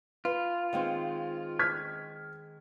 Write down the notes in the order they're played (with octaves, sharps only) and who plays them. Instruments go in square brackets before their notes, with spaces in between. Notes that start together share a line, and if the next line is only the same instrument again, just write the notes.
[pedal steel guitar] F4 [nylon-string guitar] B4
[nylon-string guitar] D#3 G#3 C4
[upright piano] F6 G#6 B6